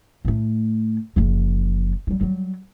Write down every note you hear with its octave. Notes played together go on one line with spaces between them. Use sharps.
A2 A3
F#1 F3
F#3 G3
F#3 G3